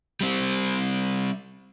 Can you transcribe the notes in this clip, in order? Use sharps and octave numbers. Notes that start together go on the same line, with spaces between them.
G3 C4